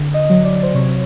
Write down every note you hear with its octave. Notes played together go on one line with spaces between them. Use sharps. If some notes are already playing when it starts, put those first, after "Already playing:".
Already playing: D3
D#5
F#3
D5
C5
C3 C#5